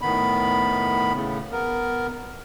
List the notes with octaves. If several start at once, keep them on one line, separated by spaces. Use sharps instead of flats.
A2 D#3 B3 B5
A2 C#3
B3 A#4